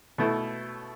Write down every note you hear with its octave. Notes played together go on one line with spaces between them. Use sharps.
B2 A3 E4